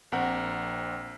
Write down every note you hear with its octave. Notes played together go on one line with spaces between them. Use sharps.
A#1 C4 A#4 F#5